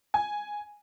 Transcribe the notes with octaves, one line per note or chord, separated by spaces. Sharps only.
G#5